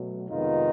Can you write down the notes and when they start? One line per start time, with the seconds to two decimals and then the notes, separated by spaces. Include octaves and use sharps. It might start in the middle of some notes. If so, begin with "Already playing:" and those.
Already playing: B2 F#3 A3
0.28 F2 C3 D#3 G#3 B3 D#4 F4